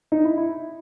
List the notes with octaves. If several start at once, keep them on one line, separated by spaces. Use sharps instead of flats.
D#4
E4
E4